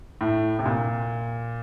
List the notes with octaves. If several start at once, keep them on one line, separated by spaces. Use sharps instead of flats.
A2
C3
A#2